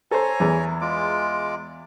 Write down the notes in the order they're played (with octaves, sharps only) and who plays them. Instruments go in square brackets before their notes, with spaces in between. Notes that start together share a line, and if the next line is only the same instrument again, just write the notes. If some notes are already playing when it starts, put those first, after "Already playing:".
[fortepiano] A4 C5 [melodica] C#5 G#5 A#5
[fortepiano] E2 E3
[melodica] G#3 F4 D6